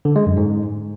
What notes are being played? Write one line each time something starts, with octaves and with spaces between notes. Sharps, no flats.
D3
G#3
F#2
G#2